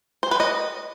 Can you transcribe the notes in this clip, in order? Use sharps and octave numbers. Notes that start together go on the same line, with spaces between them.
C5
B4
D#5